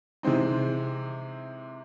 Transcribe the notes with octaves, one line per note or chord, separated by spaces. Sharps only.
C3 E3 G#3 C4 D#4